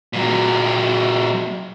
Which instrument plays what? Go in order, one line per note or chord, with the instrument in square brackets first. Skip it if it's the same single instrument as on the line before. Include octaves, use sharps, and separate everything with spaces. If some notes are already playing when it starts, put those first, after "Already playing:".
[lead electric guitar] A#2 F#3